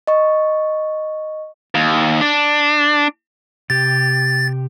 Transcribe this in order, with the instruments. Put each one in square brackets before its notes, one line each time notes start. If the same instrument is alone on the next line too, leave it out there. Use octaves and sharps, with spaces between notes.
[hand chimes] D#5 C#6
[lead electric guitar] D#2
D4
[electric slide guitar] C3 G4 [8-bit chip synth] A6